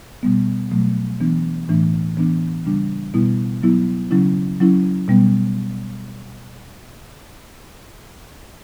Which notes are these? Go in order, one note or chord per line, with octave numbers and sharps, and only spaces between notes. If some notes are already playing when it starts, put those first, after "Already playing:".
B2 G3 B3
B2 F#3 A3
E3 B3 D4
A2 E3 A3 D4
E3 B3 D4
C#3 G3 D4
B2 G3 B3 E4
F#3 B3 E4
C#3 F#3 C#4 E4
F#3 C#4 E4
B2 G3 B3